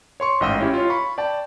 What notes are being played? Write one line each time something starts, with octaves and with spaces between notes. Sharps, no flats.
C#5 C6 C#6
A1 G#2 D#5 G5 E6
C#4 E4 G4
F4 C#5
B5 C#6
D5 G5 A5